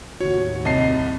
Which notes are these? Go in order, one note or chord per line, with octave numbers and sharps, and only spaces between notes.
D#2 A2 F#4 C#5
C2 D#5 A5 C7